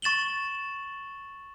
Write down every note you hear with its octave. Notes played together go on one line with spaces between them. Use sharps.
C#6 A6 E7 F#7 G7